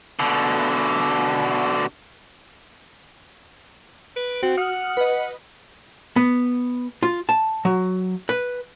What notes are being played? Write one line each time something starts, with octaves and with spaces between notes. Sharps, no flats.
B2 D3
B4 D7
C4 F#4
F#5 D#6 F6
B4 D#5
B3
F4
A5
F#3
B4